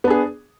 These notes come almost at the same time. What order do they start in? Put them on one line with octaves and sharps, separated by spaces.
B3 D4 G#4